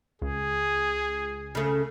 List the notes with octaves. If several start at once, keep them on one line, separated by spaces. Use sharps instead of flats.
C#2 G#4
C#3 A3